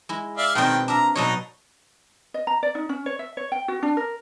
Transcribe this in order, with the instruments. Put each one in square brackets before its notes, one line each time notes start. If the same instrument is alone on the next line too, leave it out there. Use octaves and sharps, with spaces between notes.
[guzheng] G#3 E4
[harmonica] D5 E5 F5
[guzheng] B2 C4 [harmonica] D#3 D4 G5
[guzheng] D4 A#4 E5 [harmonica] A#5
[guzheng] B2 F#3 C#5 [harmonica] D4 D#4
[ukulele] D#5
A#5
D5
D#4
C#4
C#5
E5
C#5
G5
F#4
D4
A#4